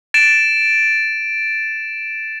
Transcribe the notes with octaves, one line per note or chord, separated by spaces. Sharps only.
A6 D7 E7